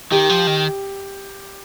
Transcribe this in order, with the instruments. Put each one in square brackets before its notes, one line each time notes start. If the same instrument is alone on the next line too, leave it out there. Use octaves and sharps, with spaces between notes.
[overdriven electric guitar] D#3 [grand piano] G4
[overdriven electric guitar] F3
D#3